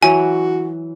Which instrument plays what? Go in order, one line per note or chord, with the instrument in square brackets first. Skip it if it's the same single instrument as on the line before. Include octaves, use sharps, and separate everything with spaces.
[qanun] E3 F#3 [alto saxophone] F#4 [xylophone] G#5